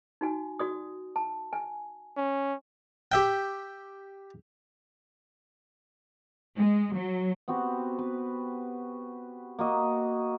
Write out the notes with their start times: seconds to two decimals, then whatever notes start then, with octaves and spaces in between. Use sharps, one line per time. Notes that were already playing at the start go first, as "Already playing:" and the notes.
0.21 D#4 F#4 G#5
0.59 F#4 D5 D#6
1.16 A5
1.53 G#5
2.17 C#4
3.12 G4 E5 G5
6.57 G#3
6.95 F#3
7.48 B3 C4 F#4 G4
7.98 B4
9.59 A#3 F#4 D#5